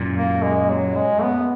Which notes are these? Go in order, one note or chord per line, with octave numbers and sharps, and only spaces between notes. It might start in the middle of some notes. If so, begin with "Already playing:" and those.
Already playing: F#2 A#2
A#3
G#3
F#3
G#3
B3